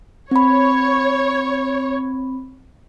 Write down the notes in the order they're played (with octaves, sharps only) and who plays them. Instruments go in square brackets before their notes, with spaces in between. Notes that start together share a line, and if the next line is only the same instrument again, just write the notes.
[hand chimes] C4 B5 [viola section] C#5